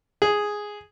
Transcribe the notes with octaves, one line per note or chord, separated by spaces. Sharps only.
G#4